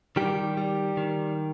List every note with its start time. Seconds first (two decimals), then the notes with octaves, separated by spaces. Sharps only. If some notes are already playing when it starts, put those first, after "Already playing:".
0.16 D#3 G3 G4
0.57 G3
0.97 D#3